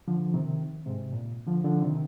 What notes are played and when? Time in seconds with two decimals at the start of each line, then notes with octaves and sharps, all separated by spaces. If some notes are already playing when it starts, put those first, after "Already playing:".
0.08 D3 F3
0.34 C3 D#3
0.86 G#2 C3
1.13 A#2
1.47 D3 F3
1.65 D3 F3
1.82 C3 D#3